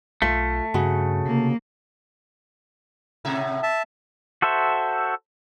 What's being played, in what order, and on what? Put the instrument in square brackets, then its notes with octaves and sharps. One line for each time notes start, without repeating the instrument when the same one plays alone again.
[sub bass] B1 [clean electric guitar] A3 [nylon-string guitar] F4 E5
[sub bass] G2 [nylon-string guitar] C#3 F#4
[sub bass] C3 [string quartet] A#3
[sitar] A2 C3 E5
[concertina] E5 A5
[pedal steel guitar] F#4 A4 C5 E5